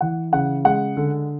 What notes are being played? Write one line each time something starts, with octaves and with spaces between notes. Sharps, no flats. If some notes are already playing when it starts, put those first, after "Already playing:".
E3 F#5
C#3 F#5
G#3 F#5
D3